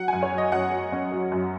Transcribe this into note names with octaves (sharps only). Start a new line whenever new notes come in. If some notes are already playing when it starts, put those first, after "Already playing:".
Already playing: F#3 F#5
F#2 G#5
C#5
F#3
D#5
F#2 F#5
F#3
C#4
F#3
F#2